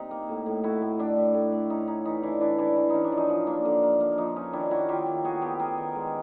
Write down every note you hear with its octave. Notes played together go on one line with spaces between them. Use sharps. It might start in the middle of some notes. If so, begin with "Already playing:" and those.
Already playing: C3 D#4
A#3
A2
A2
A2 E4 F#4
A2
A2 D4 E4
A2
A2
A3
C#4 D#4
C#4 D#4
E3 D#4
E3 D4 E4
E3 D4 E4
E3 D4 E4
E3 E4
C#4 D#4
D4
F3
D#4
F3
A#3 D4
D3
A#3
A#3
F3 D#4
C#4 D#4
D#3 D4 E4
D#3 E4 F#4
D#3 F4 G4
D#3
B3 F#4 G#4
B3 G4 A4
D#3 G#4 A#4
D#3
G#3